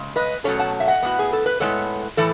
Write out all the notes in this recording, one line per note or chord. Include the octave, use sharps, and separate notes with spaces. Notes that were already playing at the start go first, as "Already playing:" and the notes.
Already playing: C#3 G#3
B4 D#5
B2 F#3 A3 C#4 A4 C#5
F#5 A5
E5
D#5 F#5
A2 G#3 B3 F#4
G#4
A4
B4
A2 G#3 B3 A4 C#5
A2 E3 A4